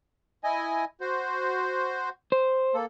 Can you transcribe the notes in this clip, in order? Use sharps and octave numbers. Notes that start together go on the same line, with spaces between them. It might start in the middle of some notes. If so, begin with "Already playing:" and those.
E4 D#5 G#5
F#4 C5
C5
A#3 A4